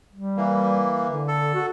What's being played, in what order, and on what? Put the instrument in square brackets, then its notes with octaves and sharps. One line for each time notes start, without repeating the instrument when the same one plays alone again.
[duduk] G3
[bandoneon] E3 A#3
[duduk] D3
[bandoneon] A4
[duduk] F#4